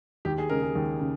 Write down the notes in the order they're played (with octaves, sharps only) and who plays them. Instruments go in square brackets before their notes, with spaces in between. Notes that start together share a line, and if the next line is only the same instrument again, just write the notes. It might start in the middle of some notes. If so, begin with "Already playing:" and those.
[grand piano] D#2 G4
G#4
C#3 G#3 A#4
G#4
D#2
C#3